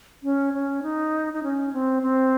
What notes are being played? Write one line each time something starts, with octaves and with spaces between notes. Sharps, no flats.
C#4
C#4
D#4
D#4
C#4
C4
C4